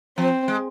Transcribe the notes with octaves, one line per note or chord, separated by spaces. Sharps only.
F3 C4
G#3